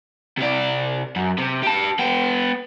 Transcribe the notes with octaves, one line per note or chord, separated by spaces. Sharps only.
C3 D5
F#2
C3
G4 A5
B3 G5